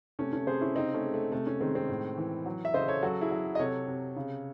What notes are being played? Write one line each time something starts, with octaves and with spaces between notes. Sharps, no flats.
C3 A3 C#4
A3 C#4
C3 G#4 C5
C#4 E4
C#3 C4 D#4
A3 C#4
G#3
A3
C3 A3
A3 C#4
D#3 G#3 C4
G#3 C4
A2
E3
F#3
E5
C#3 C5 D#5
A4 C#5
F#3 F#4 A4
E4 G#4
F#3
D#5
C3 A4 C#5
C3
C#3